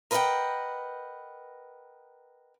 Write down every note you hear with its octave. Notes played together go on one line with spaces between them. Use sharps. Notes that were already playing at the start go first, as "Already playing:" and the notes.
A#4 B4 D#5 E5 F#5 G5